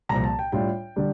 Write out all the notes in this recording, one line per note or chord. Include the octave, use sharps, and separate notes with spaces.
C2 A#2 F3 A#5
A5
G5
A2 G3 D4 F4 G5
D3 G3 D4